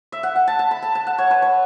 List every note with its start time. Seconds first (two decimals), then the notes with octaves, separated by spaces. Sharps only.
0.12 E5
0.23 F#5
0.35 F#5
0.47 A5
0.59 A5
0.71 B5
0.82 A5
0.95 A5
1.07 F#5
1.18 C#5
1.31 B4
1.42 C#5